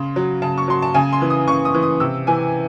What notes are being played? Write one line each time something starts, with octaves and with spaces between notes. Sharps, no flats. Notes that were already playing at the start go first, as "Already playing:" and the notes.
Already playing: C#3 C6
F#3
C#3 A5
C#6
F#3 C6
A5
C#3 G#5
C6
E3
D#6
C#3 C#6
D#6
E3
D#6
C3 E6
E3 G#5